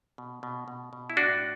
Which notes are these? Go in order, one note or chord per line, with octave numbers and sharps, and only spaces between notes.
B2
B2
B2
B2
E4
A2 D4 F#4